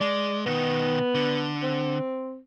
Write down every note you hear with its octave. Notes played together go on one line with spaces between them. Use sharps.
G#3 D5
B2 D#3 B3
D3
C4